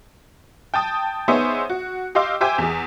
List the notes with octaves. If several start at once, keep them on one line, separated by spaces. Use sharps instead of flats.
G5 A5 D#6
B3 D#4 G#4 C5 C#5 E5
F#4
G4 D#5 F5 C6 D6 E6
G4 C5 E5 G5 G#5 D6
E2 G#4